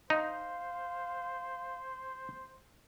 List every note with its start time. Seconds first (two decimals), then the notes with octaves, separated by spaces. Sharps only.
0.10 D#4 C5 F5